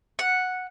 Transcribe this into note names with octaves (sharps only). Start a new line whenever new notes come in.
F#5